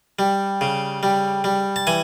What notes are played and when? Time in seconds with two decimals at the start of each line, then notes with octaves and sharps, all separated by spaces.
0.19 G3
0.61 C#3
1.03 G3
1.44 G3
1.76 A5
1.87 E3 G#5